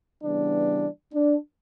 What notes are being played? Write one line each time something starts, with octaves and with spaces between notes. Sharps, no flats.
C#3 E3 G3 B3 D4
D4